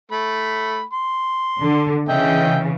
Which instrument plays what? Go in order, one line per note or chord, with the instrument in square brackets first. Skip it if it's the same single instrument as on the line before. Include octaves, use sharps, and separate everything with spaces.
[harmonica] A3 B5
C6
[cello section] D3
[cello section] C#3 E3 [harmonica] D#5 E5 G5